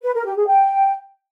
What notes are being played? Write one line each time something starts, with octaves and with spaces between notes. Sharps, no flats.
B4
A#4
G4
G#4
G5